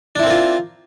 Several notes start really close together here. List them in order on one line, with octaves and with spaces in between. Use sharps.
D4 E4 C4 A#3 F4